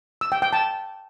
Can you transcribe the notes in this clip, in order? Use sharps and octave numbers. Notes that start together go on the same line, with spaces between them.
E6
G5
G5
A5